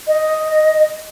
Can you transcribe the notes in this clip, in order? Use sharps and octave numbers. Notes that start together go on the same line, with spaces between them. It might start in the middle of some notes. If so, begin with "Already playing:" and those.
D#5